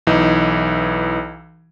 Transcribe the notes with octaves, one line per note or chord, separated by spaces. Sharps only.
B1 E3 D#4